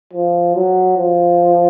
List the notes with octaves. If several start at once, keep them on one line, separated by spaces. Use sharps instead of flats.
F3
F#3
F3